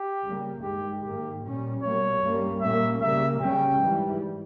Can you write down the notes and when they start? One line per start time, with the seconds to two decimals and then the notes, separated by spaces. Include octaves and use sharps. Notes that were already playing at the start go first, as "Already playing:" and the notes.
Already playing: G4
0.23 C#3 G3 A#3
0.63 G2 D#3 G#3 G4
1.02 G#2 D#3 A#3 G4
1.43 A#2 G3 C#4
1.82 B2 G3 A#3 C#5
2.21 G2 G3 A#3 C#4
2.61 A#2 G3 A#3 C#4 E5
3.01 C#3 G3 A#3 E5
3.41 C#3 G3 C#4 G5
3.80 G#2 E3 G3